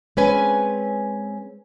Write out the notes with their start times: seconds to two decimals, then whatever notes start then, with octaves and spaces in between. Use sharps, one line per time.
0.17 G#3 C4 C#4 B4 G#5